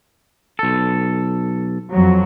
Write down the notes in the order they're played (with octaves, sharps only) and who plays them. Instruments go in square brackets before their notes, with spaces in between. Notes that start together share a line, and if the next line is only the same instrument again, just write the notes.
[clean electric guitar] B1 A4
[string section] F2 F#3